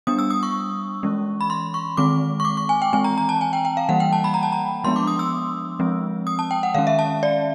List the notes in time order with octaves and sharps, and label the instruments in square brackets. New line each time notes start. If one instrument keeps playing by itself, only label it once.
[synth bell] G3 B3 D4 D#6
E6
D#6
C#6
E3 G#3 C#4
B5
C6
C#6
D#3 G#3 C4 D6
C#6
D6
C#6
G#5
G5
E3 G#3 C4 G#5
A#5
A#5
A5
G#5
G5
G5
F5
E3 G3 A#3 F#5
G5
A5
B5
A#5
A5
A#5
F3 G#3 B3 D4 C6
D6
D#6
E6
F3 G#3 C4
D#6
A5
G5
F#5
D#3 G#3 C#4 F5
E5
A5
D5